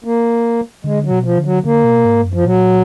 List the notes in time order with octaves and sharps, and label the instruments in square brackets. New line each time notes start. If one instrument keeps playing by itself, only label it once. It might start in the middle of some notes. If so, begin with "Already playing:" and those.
[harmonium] A#3
[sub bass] D3 [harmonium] G#3
[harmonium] F#3
[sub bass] B2
[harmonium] F3
[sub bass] D3
[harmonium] F#3
[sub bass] D3 [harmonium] A#3
[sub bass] B2
G#2
F#2
[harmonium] F3
[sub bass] A#2 [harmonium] F#3